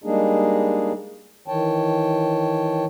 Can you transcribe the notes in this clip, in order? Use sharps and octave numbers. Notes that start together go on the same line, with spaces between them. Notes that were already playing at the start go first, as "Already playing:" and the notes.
G3 G#3 A#3 D4 D#4 G#4
D#3 E3 C#5 G5 A5